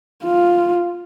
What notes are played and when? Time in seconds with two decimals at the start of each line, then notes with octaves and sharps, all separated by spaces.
0.24 F4